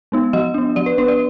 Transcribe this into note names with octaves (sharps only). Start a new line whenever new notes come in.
G#3 B3 D#4
F3 D#5
B3 D4
F3 D5
B4
B3 D4 B4
D5